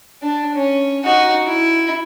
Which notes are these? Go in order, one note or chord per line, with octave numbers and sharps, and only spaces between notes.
D4
C#4
D#4 F#4
E4